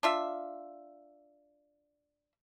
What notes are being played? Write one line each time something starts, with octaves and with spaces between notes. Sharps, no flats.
D4 F4 E5